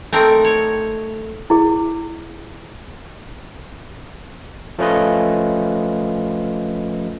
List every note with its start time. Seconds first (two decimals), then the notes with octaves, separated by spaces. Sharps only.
0.13 A3 C4 D#4 A#4
0.45 C#5
1.50 E4 G#4
4.79 F3 A3 C#4 F4 B4 D#5